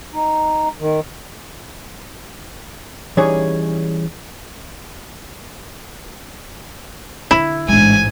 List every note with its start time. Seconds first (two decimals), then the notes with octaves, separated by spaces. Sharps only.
0.14 D#4
0.80 D#3
3.17 E3 G3 C#4 D#4 G#4 C#5
7.31 D3 E4
7.68 A1 G#2 G#3 D4 G#5